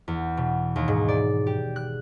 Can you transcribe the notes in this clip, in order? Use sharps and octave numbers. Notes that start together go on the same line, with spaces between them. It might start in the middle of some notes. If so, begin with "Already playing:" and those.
E2
B2
D#2
G#2
D5
G4
F#6